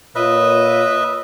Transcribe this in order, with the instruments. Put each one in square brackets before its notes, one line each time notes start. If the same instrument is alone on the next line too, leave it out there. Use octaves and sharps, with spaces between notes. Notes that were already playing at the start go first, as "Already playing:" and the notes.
[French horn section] A#2 F4 C#5 [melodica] B4 D#5 E5